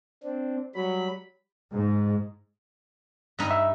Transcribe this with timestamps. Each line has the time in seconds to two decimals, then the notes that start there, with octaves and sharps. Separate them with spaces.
0.24 C4 D4
0.75 F#3 G3 B5
1.73 G#2
3.39 G2 D#4
3.51 E5